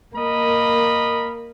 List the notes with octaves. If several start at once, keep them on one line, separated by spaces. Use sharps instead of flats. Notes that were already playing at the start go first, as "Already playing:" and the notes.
A#3 A#4 D#5 B5